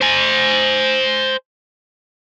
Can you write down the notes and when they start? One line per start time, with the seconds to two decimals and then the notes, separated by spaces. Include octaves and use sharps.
0.01 C5 G#5